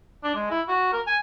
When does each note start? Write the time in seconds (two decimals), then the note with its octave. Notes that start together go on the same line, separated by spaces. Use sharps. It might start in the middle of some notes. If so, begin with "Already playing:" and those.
0.24 D4
0.35 G#3
0.51 E4
0.68 F#4
0.92 A#4
1.07 G#5